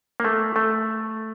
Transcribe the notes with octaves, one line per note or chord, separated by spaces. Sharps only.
A#3
A3
A3